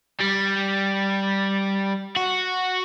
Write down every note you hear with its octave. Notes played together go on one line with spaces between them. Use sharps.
G3
F#4